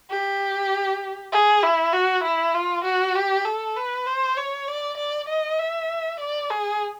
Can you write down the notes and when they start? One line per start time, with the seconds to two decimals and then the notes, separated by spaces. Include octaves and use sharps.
0.10 G4
1.32 G#4
1.63 E4
1.93 F#4
2.24 E4
2.54 F4
2.84 F#4
3.15 G4
3.45 A4
3.76 B4
4.06 C5
4.37 C#5
4.68 D5
4.98 D5
5.29 D#5
5.59 E5
6.20 D5
6.50 G#4